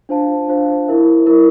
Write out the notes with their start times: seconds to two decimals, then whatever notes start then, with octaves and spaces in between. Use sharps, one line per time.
0.09 D4 F4 C5 F5 A5
0.48 D4 F4 C5 F5 A5
0.87 E4 A#4 E5
1.26 E4 A#4 E5